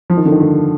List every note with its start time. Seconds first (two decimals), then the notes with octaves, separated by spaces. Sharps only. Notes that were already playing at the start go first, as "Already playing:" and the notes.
0.10 F3
0.17 D#3
0.25 D3
0.32 D#3
0.40 D3